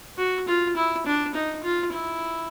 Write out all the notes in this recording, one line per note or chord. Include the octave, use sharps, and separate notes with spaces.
F#4
F4
E4
D4
D#4
F4
E4